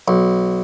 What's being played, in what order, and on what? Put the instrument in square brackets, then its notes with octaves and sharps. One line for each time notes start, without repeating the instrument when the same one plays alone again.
[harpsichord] B1